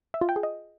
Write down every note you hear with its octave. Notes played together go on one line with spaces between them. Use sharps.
E5
F4
G5
G#4
D#5